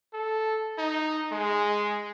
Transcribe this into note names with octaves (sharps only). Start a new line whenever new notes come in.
A4
D#4
G#3